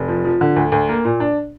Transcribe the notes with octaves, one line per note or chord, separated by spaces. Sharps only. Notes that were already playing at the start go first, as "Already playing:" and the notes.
Already playing: F1
F3
F3
D3
D2
D2
A#3
A#2
D4